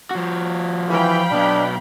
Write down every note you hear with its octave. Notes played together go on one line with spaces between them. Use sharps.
F3 F#4
E3 F5 G5 B5
B1 B3 D4